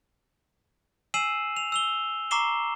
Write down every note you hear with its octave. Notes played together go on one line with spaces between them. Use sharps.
G#5 E6 C7 D#7 E7 F#7
F7
E6 F7 G7
A#5 C#6 D6 C7 E7 G7